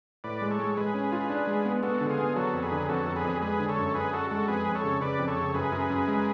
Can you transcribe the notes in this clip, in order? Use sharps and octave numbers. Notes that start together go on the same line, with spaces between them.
A2 B4 D5
G#3
A4 C#5
G#3
G#3 G#4 B4
C#4
F4
D4
G#3
B3
B3 F#4 A4
D3
F4 G#4
B3
F#3 F#4 A4
F2
G#4 B4
D3
F2 F#4 A4
F2
G#4 B4
F2
G#3 G#4 B4
D3
A4 C#5
F#2
F#2 G#4 B4
F#2 F#4 A4
G#3 F#4 A4
F2 G#4 B4
F2
A4 C#5
C#3
C#3 B4 D5
F2
A4 C#5
C#3
F#2 G#4 B4
F#2
F#2
G#3